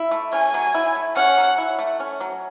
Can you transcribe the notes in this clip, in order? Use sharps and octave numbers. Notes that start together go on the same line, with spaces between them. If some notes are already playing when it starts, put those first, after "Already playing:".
Already playing: E4
A3
C#4 G#5
F#3
E4
A3
C#4 F#5
F#3
E4
A3
C#4
F#3